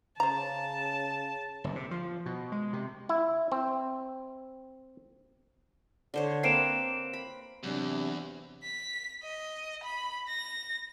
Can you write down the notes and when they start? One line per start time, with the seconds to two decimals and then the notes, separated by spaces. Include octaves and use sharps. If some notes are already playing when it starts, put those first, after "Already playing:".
0.20 C#3 C5 A5 A#5
1.64 F#1
1.76 C3
1.91 F3
2.26 B2
2.52 G#3
2.73 C3
3.09 E4
3.52 C4
6.14 D3 C5 C#5
6.43 A#3 C4 B4 C7 D7 E7
7.13 B5
7.63 E2 C3 F#3 D4
8.63 B6
9.23 D#5
9.84 B5
10.28 A#6